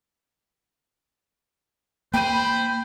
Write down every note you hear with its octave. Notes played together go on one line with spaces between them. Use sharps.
A#3 C5 G5 B5 D#7